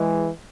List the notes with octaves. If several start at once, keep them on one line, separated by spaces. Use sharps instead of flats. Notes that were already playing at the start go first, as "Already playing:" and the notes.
Already playing: E3 G#3